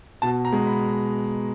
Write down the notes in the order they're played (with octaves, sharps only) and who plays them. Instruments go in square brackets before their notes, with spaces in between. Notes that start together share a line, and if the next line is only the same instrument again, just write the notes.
[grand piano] B2 A5
A#5
G#3
B5